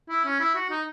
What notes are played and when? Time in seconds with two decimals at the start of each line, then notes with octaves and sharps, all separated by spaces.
0.09 E4
0.25 C#4
0.40 E4
0.55 F#4
0.70 D#4